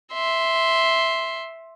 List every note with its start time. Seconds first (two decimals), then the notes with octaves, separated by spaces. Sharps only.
0.14 E5 C6